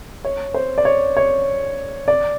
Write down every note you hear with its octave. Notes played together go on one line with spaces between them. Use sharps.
C#5
C5
D5
C#5
C#5
D5